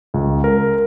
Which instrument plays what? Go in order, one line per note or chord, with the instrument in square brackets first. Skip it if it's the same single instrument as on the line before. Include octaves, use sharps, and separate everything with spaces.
[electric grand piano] C#2
A#4